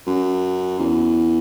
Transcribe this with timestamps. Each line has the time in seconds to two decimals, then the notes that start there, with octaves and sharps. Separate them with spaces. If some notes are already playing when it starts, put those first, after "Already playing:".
0.06 F#2
0.79 E2